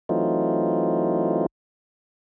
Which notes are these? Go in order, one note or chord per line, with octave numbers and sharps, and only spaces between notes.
E3 F#3 A3 C4 D#4 F4